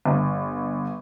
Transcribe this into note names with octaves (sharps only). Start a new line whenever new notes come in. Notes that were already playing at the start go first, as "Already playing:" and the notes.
G1